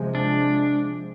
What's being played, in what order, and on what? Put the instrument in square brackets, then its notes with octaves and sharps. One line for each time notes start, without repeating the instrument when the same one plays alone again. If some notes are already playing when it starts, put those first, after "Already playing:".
Already playing: [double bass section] C3 F3 G#3
[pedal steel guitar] D4